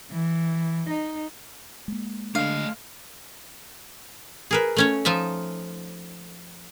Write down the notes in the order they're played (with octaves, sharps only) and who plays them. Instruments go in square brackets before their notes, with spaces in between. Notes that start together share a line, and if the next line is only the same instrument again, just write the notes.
[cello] E3
D#4
[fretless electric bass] G#3 A#3
[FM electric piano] D3 [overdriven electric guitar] A3 D#5 [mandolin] F5
[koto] G#4 A#4 B4
A3 C#4 C#5
F3 D#4 F4 E5